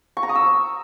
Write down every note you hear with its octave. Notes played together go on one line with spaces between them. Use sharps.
C#6
A#5
D#6
E6